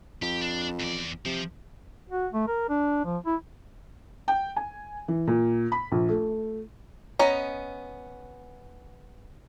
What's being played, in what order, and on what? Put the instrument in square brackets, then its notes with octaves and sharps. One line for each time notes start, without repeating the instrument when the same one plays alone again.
[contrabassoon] F2 [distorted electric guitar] G4
[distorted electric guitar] D4
E2 D5
[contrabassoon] C3 [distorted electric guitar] F3
[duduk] F#4
A3
A#4
D4
F3
E4
[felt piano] G5
G#5
E3
A#2
B5
A#1
A3
[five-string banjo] B3 C#4 D#5 A#5